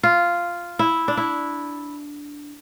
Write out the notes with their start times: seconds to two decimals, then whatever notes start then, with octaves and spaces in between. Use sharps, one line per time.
0.03 F4
0.79 E4
1.08 D4
1.17 E4